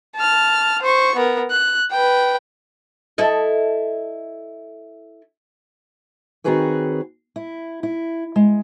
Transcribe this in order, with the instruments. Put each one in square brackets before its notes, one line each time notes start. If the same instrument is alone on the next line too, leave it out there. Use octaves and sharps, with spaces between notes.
[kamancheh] A5 F6
C5 C#6
B3 A#4
F#6
B4 G5
[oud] E4 A4 D#5
[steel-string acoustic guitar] D#3 C4 F#4 G#4 B4 C#5
E4
E4
G#3